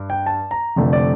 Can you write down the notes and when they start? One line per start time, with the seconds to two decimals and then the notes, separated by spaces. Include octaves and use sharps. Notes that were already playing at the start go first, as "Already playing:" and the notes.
Already playing: G2
0.10 G5
0.26 A5
0.51 A#5
0.76 F1 F2 D3 A3
0.93 D5